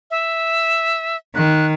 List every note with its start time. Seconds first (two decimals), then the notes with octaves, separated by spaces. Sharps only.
0.11 E5
1.35 D#3 F#6